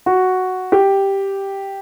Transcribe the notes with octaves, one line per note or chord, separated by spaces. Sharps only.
F#4
G4